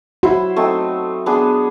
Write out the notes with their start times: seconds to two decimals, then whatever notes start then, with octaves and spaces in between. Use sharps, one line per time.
0.23 E4 F#4 C5
0.56 A3 C4 D#4
1.26 B3 D4 G#4